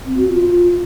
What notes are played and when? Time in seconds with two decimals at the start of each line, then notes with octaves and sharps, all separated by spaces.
0.05 C4
0.17 F#4
0.28 F4